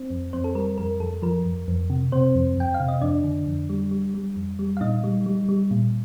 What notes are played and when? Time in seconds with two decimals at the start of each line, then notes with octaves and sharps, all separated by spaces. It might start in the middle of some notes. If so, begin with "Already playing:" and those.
Already playing: C4 C5
0.10 F2
0.33 F2 C4 C5
0.44 A4
0.55 G3 A#4
0.78 F2 A#4
1.00 F2 A4
1.22 F3 A#4
1.45 F2
1.68 F2
1.90 C3
2.12 C3 C4 C5
2.35 F2
2.57 F2 G5
2.74 F5
2.80 C3
2.88 D#5
3.01 F2 D4 D5
3.24 D3
3.47 F2
3.69 G3
3.91 G3
4.14 G3
4.36 F2
4.59 G3
4.77 F5
4.81 A#2 D#4 D#5
5.04 G3
5.26 G3
5.49 G3
5.71 A#2